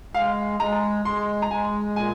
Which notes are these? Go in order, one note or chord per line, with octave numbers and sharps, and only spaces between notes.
G#3 F5
G#3 A#5
G#3 C6
A#5
G#3 G#5
A#2 G#5